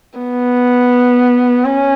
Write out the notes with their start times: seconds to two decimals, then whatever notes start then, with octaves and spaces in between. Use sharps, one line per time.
0.19 B3
1.65 C#4